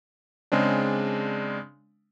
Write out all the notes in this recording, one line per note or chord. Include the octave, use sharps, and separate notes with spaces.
C#3 G#3 C4 D4